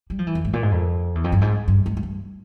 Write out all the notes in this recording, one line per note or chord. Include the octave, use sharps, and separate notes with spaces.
G3
F3
E3
F2
G#2
A#2
G#2
F2
E2
F2
G2
G#2
G2
G#2
G#2
G2